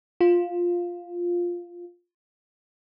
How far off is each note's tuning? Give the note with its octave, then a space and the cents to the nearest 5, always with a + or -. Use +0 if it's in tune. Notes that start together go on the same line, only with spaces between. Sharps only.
F4 +5